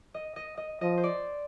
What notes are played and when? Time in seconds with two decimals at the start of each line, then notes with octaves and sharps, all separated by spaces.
0.14 D#5
0.36 D#5
0.57 D#5
0.81 F3 D#5
0.98 C5
1.04 D5